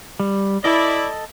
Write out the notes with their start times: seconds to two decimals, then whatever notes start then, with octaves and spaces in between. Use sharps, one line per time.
0.20 G3
0.64 E4 A4 D5 D#5